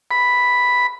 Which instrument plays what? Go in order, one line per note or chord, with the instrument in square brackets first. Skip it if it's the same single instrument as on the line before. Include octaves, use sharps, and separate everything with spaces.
[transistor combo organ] B5